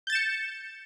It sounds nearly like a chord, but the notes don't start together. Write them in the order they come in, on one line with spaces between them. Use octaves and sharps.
G6 A6 E7 C#7